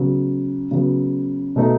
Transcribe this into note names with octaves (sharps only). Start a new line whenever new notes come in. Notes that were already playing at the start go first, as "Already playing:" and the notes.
Already playing: C#3 F#3 B3
C#3 F#3 B3
B2 A3 D#4